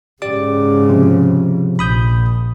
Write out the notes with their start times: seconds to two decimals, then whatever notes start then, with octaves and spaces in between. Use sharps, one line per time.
0.22 G#2 C#3 G4 D5 D6
0.89 C3 F3
1.79 A#1 B5 D#6 G6